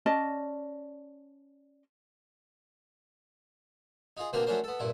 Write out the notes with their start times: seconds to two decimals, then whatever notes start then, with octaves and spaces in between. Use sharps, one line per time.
0.06 C#4 D5 D#5 A5
4.17 D#4 F4 G#4
4.33 B2 D3 A#3 C4 G4 A#4
4.46 F#3 A3 C#4 D4 A#4 C5
4.64 B3 A4
4.80 G2 A#2 E4